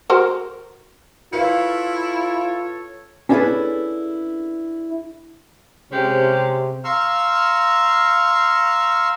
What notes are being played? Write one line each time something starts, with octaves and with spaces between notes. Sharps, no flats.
F#4 A#4 C5
E4 F4 A4 B4 C#5 F5 C#7
C#4 D4 E4 G#4 A4 B4
C3 G#3 C#4 G4
F5 A#5 C6 C#6 E6 F6